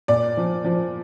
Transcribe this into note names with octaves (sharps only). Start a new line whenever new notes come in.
A#2 D5
F3
F3